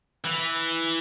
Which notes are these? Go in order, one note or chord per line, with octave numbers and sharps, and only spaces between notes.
E3